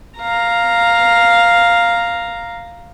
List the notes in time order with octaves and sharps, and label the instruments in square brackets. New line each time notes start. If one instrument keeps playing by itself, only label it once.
[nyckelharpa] F5 A#5